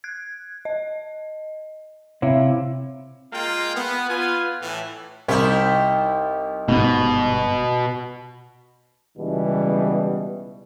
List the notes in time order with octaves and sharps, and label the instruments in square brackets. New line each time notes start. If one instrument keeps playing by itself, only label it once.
[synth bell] F#6 G#6
D#5
[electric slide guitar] C3 E4 [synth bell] C#5 E5 F5
[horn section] G#3 A#3 F4 F5 G5
B3
B3 F4 B4 G#5
A2 E3
[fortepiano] C2 [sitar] D#4 E4 G4
[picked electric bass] G1 B3 [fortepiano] G#2 [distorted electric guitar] B2
[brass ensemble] C#2 B2 E3 G3